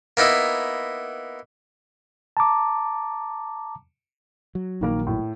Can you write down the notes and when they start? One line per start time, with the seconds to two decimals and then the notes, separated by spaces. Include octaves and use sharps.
0.17 A#3 B3 D#4 E4
2.37 A5 A#5 D6
4.55 F#3
4.81 A#1 A#2 D#3 F#3 A#3 A#4
5.07 A2